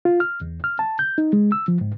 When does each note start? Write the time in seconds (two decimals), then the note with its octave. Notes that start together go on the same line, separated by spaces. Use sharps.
0.05 F4
0.20 F6
0.41 E2
0.64 F6
0.79 A5
0.99 G6
1.18 D#4
1.33 G#3
1.52 E6
1.68 F3
1.81 G#2